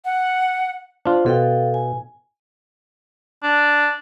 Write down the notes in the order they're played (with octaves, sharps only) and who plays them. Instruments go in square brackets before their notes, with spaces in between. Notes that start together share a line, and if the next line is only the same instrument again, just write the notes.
[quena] F#5
[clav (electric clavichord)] D4 F4 [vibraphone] C5
[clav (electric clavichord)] B2 [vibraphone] A4 F5 G5
[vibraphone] G#5
[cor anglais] D4